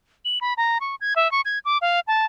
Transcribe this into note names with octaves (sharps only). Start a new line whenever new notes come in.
F#7
B5
A#5
C#6
G#6
E5
C#6
G#6
D6
F5
A5